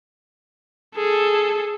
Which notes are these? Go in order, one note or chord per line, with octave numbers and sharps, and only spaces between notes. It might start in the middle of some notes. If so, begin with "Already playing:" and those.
G#4 A4